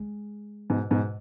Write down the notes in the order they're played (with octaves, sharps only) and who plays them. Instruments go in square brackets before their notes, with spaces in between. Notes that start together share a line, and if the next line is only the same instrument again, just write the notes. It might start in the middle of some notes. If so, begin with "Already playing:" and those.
Already playing: [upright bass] G#3
[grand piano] G#2 B2
G#2 B2